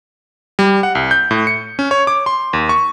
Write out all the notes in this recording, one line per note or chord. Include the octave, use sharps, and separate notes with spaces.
G3
F#5
C2
G6
A2
C#7
C#4
C#5
D6
C6
D#2
C#6